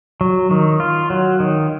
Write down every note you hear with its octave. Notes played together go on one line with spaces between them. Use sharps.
F#3
D#3
F4
F#3
D#3